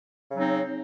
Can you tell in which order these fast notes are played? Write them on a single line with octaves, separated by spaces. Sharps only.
C#3 F#3 D#4 C4